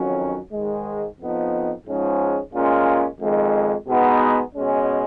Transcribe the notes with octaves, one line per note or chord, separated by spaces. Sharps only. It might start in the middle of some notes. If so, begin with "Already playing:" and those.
Already playing: F2 D#3 F#3 C#4
G#2 D#3 G#3
F2 F3 B3 D#4
G#2 F3 G#3 C#4
A#2 G#3 C#4 F4
F2 D#3 G#3
B2 G#3 B3 D#4
B2 G#3 C#4